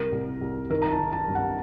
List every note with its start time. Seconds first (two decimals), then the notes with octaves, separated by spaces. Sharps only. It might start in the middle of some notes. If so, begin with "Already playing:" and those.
Already playing: C2 A#4
0.12 C2
0.41 C2
0.70 D#3 A#4
0.82 A#5
0.91 A5
0.98 D#3
1.13 A5
1.28 G2
1.35 F#5